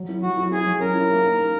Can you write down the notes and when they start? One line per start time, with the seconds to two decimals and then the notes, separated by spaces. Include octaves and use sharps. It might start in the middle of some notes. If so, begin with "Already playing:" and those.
Already playing: F#3
0.09 E4
0.23 F#3 F#4
0.37 E4
0.51 E4 G#4
0.66 F#3
0.80 C#4 A#4
0.94 E4
1.10 A#3
1.24 D#4
1.39 A#3